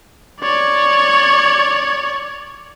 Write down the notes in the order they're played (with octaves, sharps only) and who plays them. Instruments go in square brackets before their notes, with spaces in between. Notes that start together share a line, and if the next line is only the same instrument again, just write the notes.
[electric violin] C#5 D5